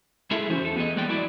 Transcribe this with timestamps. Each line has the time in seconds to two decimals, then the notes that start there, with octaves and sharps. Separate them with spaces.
0.31 G#3 E4 G#4 A4 E5
0.50 E3 C#4 D#4 F#4 C5
0.62 E2 A4
0.76 B3 G#4 D#5
0.96 G#3 A#3 B4 D5 G5
1.09 F#3 E4 D5